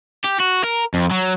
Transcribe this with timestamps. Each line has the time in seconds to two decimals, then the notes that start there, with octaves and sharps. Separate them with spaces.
0.25 G4
0.40 F#4
0.64 A#4
0.94 F2
1.11 F#3